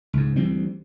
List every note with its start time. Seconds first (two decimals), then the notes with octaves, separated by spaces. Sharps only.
0.13 C#2 G#2
0.36 D2 E3 G3 C4